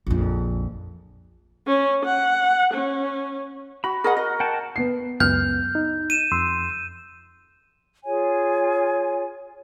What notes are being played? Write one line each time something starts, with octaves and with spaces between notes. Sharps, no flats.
A#1 F2
C#4
F#5
C#4
F#4 B5
G#4 A#4 D#5 F#5
D#5
F#5 G5 A5
B3 C7
C#2 F#2 B3 F6 G6
D#4
D#7 E7
F2 C6 E6
F4 G#4 C#5 G#5